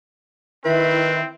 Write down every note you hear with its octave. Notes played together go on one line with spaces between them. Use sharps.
D#3 C4 E4 B4 E5